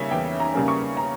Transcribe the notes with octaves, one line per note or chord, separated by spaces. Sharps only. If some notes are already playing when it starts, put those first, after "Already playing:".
Already playing: C#3 G3 A#3 C#4 C#5 E5
E2 G5
A#5
C#3 G3 A#3 C#4
C#6
A#5